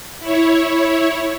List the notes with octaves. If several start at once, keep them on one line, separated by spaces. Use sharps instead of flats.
E4 C#5